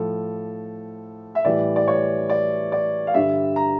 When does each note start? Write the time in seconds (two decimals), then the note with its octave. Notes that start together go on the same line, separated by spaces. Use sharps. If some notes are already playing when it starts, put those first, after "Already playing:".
Already playing: A2 F3 A4
1.35 E5
1.45 A2 E3 G3 D5
1.76 D5
1.88 C#5
2.30 D5
2.72 D5
3.07 F5
3.14 G2 D3 G3 E5
3.56 A#5